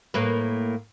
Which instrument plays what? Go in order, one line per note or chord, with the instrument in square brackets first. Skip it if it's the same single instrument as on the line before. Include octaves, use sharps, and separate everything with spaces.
[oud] A2 A#3 B4